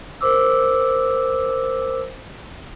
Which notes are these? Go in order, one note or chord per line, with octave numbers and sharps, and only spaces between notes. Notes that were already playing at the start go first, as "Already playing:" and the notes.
A#4 C5 D6 E6